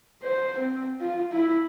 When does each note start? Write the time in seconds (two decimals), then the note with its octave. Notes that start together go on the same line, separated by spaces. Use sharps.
0.23 C5
0.59 C4
1.01 F4
1.32 E4